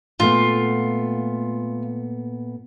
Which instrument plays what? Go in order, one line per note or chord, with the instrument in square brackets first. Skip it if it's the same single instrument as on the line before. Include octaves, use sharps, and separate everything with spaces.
[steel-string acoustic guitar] A#2 A3 B3 [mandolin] F4